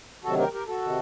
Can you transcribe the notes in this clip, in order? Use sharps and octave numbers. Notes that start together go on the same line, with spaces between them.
D2 C3 D#3 F#3 F#4 A4
G4 A#4
G4 A#4
F#4 A4
C3 D#3